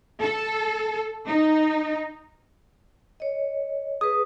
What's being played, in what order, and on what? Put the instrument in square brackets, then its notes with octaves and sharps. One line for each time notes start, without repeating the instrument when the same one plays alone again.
[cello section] A4
D#4
[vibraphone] C#5 D#5
[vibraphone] G#4 B4 [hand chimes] D#6